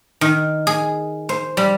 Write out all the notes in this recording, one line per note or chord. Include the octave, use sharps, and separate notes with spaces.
D#3
G#4
C5
G3